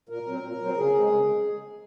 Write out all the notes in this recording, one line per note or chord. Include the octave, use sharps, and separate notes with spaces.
A#2 A#4
F#3 C4
A#2
F#3 C4
C#3 G#4
G#3 C4
C#3